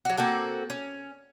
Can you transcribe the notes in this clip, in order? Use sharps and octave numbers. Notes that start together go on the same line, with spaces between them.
F#3 F#4
A#3 C4 F#4 A4
C#4